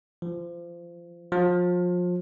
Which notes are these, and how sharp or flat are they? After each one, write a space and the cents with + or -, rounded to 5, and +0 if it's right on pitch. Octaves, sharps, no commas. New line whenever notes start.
F3 -25
F3 +30